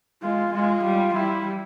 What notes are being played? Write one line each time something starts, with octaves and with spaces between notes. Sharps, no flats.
G#3 F4
G#3 F4
G3
G3 E4